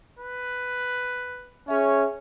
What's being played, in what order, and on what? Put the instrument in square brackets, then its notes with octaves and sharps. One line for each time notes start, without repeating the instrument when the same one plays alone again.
[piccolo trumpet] B4
[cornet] C#4 [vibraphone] G#4 E5 [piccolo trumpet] C#5